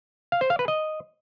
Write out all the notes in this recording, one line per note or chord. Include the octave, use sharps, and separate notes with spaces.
F5
C5
F5
B4
D#5